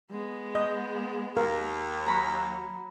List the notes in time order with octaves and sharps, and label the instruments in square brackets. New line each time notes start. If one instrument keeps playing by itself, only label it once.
[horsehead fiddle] G#3 B3
[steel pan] D#5 [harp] G6
[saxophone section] D#2 [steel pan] A#4 F5
[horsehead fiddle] F#3 [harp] A#5 B5 C#6